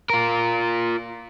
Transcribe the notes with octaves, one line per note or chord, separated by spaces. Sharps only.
F4 A#4